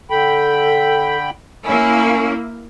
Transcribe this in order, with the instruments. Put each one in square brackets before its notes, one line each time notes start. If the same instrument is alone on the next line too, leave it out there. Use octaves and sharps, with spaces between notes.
[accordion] D3 G5 B5 [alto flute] A4
[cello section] A#3 E4 [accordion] C#4 [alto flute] G#5